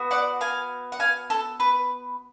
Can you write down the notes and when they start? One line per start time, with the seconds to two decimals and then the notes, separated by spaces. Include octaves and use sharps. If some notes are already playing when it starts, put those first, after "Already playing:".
Already playing: B3 F#4
0.11 D5 F#5
0.41 F5 G#5
0.92 F#5
1.00 F5 G#5
1.30 A4
1.60 B4